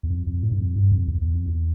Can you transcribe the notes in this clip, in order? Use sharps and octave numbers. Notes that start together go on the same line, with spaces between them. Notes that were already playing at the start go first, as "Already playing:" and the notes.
E2
F2
F2
A2
G2
F2
G2
F2
E2
E2
F2
E2